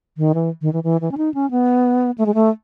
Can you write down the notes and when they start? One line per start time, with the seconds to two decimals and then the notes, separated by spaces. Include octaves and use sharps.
0.17 D#3
0.34 E3
0.62 D#3
0.73 E3
0.84 E3
1.01 E3
1.12 C#4
1.17 D#4
1.34 C#4
1.51 B3
2.18 A3
2.26 G#3
2.34 A3